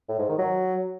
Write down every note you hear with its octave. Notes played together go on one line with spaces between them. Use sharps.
A2
G#2
D#3
F#3